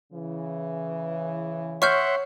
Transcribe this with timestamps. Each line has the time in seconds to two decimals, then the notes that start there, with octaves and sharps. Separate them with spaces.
0.13 C#3 E3
1.82 C#5 E5 F#5 C6 C#6 F6 G6